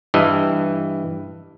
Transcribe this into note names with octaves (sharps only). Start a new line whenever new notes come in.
G2 E3 D#5